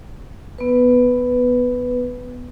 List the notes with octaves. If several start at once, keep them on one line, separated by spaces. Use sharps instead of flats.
B3 B4